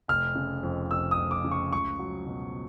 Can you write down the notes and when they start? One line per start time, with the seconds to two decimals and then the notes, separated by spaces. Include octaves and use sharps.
0.08 F1 F6
0.36 C#3
0.63 F2
0.91 F1 E6
1.11 D#6
1.17 F1
1.31 D6
1.45 C#3
1.51 C#6
1.72 C#2 C#6
1.99 F#3
2.27 B2